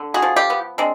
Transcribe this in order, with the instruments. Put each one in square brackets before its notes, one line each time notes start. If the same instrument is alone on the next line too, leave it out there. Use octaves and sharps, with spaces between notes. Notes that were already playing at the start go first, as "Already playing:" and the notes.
Already playing: [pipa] D3
F#4 G#4
F3
F4 G4
B3
G#3 C4 D4